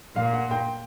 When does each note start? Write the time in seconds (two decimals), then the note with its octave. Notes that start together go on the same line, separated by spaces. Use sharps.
0.15 A#2 F5
0.33 F#5
0.51 G5